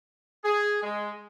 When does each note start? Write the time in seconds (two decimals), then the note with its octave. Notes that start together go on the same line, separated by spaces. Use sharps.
0.44 G#4
0.83 G#3